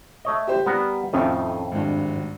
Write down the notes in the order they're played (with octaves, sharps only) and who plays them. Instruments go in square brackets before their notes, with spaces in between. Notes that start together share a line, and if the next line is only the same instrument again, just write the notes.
[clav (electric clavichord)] A3 C#5 D#5
[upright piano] G4 C5
[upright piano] G3 [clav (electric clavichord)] B3 A#4 F#5
[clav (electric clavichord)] F2 A2 D#3 [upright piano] A3 C#4 F4
[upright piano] G#1 G2